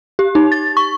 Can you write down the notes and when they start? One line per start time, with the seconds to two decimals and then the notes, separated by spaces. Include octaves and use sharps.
0.19 G4
0.35 D#4
0.52 A6
0.77 C#6